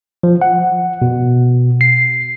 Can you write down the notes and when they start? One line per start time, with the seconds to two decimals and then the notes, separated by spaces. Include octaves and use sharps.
0.23 F3
0.42 F#5
1.02 B2
1.81 C7